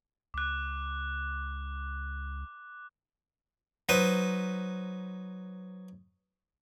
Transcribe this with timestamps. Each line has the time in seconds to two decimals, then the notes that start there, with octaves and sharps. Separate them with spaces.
0.34 C#2 D6 F#6
3.89 F#3 D#4 B4 C5